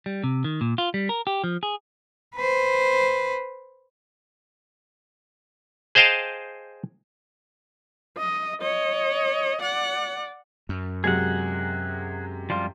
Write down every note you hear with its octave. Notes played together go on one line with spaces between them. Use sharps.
G3
C3
D#3
A#2
F4
G3
A#4
G4
F3
G#4
B4 C5
G#4 C5 D#5 F5 G5 A5
D#5
C#5 D#5
D5 F#5
F#2
C3 F#3 G#3 G#4 F#5
F3 G3 F4